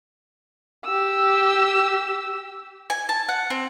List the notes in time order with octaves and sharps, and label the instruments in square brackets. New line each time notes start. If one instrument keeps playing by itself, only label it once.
[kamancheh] G4 E6
[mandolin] G#5
A5
F#5
C4